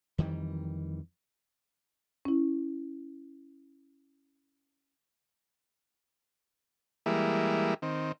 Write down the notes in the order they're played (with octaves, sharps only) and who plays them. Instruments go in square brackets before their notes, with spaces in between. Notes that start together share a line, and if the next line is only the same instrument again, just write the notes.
[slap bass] F2 D#3 E3 G3
[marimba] C#4 E4
[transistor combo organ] E3 G3 G#3 A#3 E4
D#3 C4